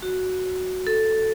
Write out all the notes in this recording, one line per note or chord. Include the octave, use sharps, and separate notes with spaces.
F#4
A4